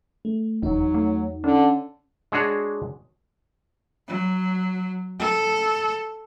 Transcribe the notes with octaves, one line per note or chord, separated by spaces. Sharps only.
A3
F1 E2 F#3 D#4
A3
D3 C#4
G#3 D4 F#4 G#4 C#5
F#3
A4